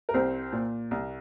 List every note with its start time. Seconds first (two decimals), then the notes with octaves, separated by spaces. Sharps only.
0.09 A#4
0.14 C2 C4 C5
0.53 A#2
0.91 C2